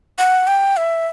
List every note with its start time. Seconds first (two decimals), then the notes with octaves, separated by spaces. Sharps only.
0.18 F#5
0.47 G5
0.77 E5